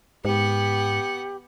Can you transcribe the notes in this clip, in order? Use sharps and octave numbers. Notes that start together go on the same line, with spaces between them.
G#2 B3 G4 F#5